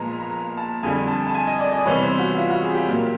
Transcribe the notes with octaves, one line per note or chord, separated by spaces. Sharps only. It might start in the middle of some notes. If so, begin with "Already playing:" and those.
Already playing: A#2 F3 G#3 B3 A#5
A#5
A#5
A5
F2 D3 G3 G#5
A5
A5
G#5
D#5
D5
D#5
C3 E3 G3 B3 C#5
C5
F#4
F4
F#4
G#4
G4
A#2 F#3 A#3